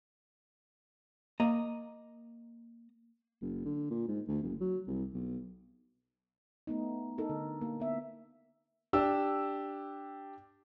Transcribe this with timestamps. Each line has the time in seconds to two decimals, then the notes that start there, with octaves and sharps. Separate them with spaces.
1.40 A#3 D#5 A#5
3.42 F#1
3.65 D3
3.90 A#2
4.08 G#2
4.28 D2
4.43 F#1
4.60 F#3
4.87 C2
5.13 B1
6.67 A3 B3 D#4
7.18 D#4 A4 A#4
7.29 D3
7.61 A#3
7.80 B3 E5
8.93 D4 G4 E6